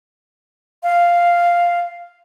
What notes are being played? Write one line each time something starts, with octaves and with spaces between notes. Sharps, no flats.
F5